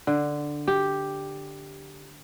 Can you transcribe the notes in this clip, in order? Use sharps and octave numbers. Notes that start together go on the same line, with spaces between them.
D3
G4